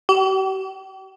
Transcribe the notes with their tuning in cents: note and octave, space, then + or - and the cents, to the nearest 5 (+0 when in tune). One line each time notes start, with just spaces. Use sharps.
G4 -45